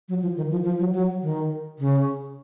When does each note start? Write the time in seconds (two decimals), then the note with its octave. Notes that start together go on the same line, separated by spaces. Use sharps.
0.09 F#3
0.22 F3
0.37 D#3
0.51 F3
0.64 F3
0.79 F#3
0.93 F#3
1.22 D#3
1.79 C#3